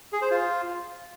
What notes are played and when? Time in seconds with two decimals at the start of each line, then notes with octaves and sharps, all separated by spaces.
0.13 G#4
0.22 C5
0.31 F4